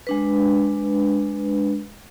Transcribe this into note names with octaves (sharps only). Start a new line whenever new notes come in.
G#3 D4 B4